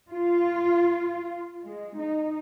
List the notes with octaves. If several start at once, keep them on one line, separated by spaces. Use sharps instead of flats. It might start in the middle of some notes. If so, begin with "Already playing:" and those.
F4
G#3
D#4